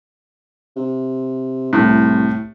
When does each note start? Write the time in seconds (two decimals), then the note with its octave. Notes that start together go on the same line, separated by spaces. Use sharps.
0.76 C3
1.73 C2 A2